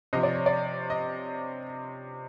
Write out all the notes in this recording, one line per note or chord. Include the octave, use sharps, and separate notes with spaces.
C3 F3 D#5
D5
C#5
D5
D#5